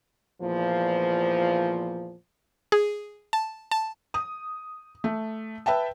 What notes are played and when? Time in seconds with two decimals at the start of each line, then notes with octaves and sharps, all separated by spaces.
0.42 E2 A#2 F3
2.72 G#4
3.33 A5
3.71 A5
4.14 D#6
5.04 A3
5.66 B4 E5 G5 A5